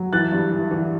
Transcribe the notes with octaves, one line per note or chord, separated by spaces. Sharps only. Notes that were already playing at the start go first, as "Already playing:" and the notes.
Already playing: F#3
E3 F#6 A6
G2
E3
E3